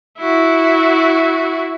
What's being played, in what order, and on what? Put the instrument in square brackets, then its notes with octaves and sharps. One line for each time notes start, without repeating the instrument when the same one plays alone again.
[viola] E4 F#4